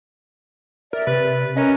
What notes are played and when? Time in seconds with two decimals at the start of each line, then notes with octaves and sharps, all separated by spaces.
0.93 A#4 D5 E5
1.07 C3 B4
1.57 C#4 A#4 D#5 A#5 F#6